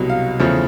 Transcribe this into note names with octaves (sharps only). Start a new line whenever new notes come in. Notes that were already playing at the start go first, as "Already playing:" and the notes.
Already playing: C2 B2 F#3
F5
E2 C#3 F3 A3